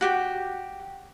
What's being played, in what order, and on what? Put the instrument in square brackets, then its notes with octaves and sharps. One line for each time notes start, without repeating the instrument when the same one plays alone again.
[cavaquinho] F#4 G4 G5